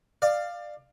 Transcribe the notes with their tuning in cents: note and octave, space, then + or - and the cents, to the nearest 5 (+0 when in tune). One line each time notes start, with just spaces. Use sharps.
D5 +25 F5 +0